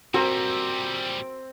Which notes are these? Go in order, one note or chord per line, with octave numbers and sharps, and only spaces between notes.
A#2 G3 C4 F#4 A#4